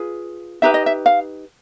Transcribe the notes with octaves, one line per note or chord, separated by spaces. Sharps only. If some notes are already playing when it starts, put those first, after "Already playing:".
Already playing: F4 G#4 B4
D#4 G4 B4 E5
D#5
E5
F5